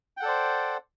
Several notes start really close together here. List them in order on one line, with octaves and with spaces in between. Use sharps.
G5 F#5 A4 D5 C5